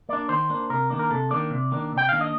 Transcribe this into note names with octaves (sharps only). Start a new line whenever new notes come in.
A#3 D4 D5
D#3 C5
A#3 D4
C3 A#4
D#3 A#3 D4
A#4
C3 A4
D#3 A#3 D4 D5
C3
D#3 A#3 D4
C3
G5
D#3 A#3 D4 F5
D#5